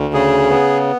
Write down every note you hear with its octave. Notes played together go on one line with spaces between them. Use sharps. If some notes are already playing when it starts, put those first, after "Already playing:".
Already playing: D2
C#3 G#4
B3